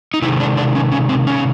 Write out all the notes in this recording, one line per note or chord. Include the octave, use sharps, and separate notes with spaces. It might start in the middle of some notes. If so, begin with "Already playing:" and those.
D#4
C3 D#3 G#3 E4
D4
D4
C#4
C#4
C4
C#4